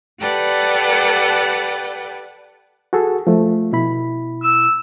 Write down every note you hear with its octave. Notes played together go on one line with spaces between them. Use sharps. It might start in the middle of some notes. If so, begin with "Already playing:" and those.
G4 A4 B4 D5 F#5 G5
F#4 G#4 A4
F3 A3
B2 E4 B5
E6